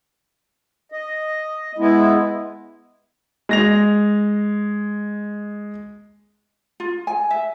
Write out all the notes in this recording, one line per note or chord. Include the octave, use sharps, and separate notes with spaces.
D#5
G#3 B3 E4
G#3 A#6 F7
F4
G#5
E5